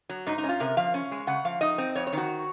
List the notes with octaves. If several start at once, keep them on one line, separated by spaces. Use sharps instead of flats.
F#3
G#2 D#4
D#4
C#4
F4
C3 A#4
F3 F5
C#4
G#3
C#3 F#5
F3 F5
D#4 D#5
C4
F2 C#5
C#5
D#3 F#4